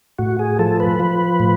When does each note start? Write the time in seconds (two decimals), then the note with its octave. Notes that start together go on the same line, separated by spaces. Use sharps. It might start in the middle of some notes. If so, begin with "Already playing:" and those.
0.19 A2 F#4
0.39 G#4
0.59 F3 A4
0.80 B4
0.99 F3
1.40 A2